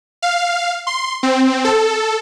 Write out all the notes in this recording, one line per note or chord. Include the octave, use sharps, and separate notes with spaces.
F5
C6
C4
A4